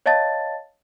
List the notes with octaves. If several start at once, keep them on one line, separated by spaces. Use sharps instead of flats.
C#5 D#5 F5 A5 A6